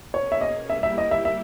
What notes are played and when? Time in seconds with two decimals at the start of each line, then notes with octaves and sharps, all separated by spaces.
0.14 B2 A#3 C#4 G#4 C#5
0.32 E5
0.41 D#5
0.69 G3 A#3 E4 G4 E5
0.83 E5
0.98 D#5
1.11 E5
1.25 E5